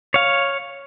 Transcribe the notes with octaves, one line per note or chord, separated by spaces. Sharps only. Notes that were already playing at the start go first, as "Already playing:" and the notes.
C#5 F5